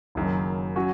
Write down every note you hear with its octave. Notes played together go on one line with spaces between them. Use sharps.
F#1 F#2 D#3
F#3 C#4 F#4